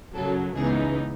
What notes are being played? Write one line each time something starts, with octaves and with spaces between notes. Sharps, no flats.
F#2 C#3 F#3 A4
C#2 C#3 E3 B3 D#4 G#4